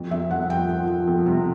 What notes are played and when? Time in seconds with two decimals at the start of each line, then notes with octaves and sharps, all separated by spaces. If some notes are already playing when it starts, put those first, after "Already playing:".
Already playing: F2
0.11 F2 E5
0.31 F2 F#5
0.50 F3 G5
0.69 F3
0.88 F3
1.07 F2
1.26 C3